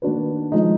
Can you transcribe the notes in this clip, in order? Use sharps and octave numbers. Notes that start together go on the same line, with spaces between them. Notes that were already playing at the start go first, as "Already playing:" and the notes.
D#3 A#3 D4 F#4 B4
F3 G#3 D#4